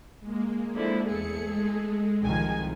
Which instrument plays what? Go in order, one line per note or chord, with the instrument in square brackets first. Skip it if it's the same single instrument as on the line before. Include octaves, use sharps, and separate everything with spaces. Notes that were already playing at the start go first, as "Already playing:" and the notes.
[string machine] G#3 A#3
[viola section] D3 F3 E4
[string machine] E2 C#7 [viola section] A3 G#4 A4
[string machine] G#3
[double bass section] C2 D#3 F3 [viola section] G#5